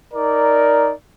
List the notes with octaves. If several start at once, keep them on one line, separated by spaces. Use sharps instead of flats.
D#4 A#4 D5